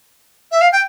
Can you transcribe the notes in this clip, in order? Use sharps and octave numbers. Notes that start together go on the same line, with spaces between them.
E5
F5
G5